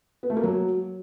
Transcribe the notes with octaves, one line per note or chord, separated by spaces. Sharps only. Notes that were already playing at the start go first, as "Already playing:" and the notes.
B3
A3
A#3
F#3